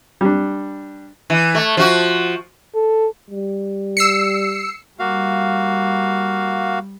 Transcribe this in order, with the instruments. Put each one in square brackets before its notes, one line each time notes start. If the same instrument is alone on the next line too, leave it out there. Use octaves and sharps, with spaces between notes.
[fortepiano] G3 D4
[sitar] E3
A3
F3 F#4
[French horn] A4
[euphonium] G3
[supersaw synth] E6 C7 C#7
[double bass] G3 [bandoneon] A#3 F#4 F5